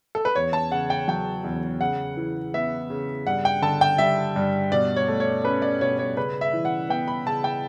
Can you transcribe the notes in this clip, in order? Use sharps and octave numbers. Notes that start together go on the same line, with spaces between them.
A4
B4
E2 C#5
A5
C#3 F#5
G5
F#3 G5
E2
C#3 F#5
E3
B3 E5
C#3
G2 F#5
G5
D3 A5
G5
G3 E5
G2
B2 D5
C#5
A3
C#5
C#4 B4
D5
B2 C#5
C#5
C#3 B4
E5
E3
F#5
B3 G5
B5
C#3 A5
G5